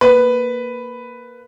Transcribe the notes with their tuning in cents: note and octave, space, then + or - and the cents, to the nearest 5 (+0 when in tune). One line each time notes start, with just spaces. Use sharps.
A#3 +0 B4 +5